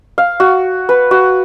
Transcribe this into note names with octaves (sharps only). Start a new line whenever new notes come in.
F5
F#4
B4
F#4